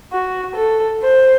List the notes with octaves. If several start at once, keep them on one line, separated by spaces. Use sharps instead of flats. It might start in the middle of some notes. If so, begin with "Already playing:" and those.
F#4
A4
C5